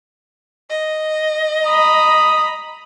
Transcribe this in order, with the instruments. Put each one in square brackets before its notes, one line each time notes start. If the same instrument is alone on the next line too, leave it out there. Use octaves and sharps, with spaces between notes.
[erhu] D#5
[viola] A#5 B5 [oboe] D#6